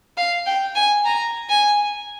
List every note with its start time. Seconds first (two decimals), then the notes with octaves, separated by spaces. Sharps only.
0.17 F5
0.46 G5
0.75 G#5
1.05 A#5
1.49 G#5